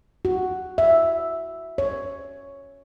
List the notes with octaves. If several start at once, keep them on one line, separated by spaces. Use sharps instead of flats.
F#4
E5
C#5